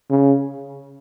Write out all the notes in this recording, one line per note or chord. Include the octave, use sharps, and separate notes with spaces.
C#3